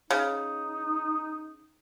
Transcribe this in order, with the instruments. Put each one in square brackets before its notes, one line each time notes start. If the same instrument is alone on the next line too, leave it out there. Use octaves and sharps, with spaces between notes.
[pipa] C#3 [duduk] D#4